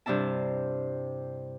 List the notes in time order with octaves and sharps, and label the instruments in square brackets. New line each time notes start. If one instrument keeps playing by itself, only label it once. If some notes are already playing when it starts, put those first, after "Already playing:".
[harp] G2 C3 D4 E4 A5